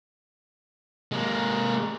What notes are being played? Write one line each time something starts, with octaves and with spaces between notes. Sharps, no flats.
G#3 A#3